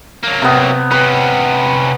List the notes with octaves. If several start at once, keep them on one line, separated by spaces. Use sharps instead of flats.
F#3 A#3
C3 B3
C3 C#4 B4